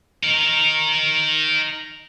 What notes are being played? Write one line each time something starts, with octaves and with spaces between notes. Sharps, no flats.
D#4 A#4